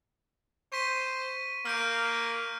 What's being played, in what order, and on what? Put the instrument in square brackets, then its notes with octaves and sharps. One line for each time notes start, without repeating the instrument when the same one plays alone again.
[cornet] C5 [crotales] C#6 B6 D#7
[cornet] A#3 [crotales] F6 G6 D7